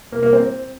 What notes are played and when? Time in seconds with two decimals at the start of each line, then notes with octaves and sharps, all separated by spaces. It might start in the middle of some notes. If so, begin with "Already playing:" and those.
0.12 A#3
0.23 A#3
0.33 C4